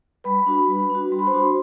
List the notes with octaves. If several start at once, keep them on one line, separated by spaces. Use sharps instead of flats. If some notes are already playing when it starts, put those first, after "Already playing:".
G3 B4 B5
D4 F#4
G3
D4
F#4
G3 C6
B5
C5 C6
D4 F#4